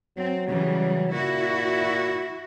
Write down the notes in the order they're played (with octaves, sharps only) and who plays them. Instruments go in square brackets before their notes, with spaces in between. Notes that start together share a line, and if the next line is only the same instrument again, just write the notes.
[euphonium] F#3 [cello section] C4
[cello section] C#3 E3 G3
[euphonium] A#2 [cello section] E4 F#4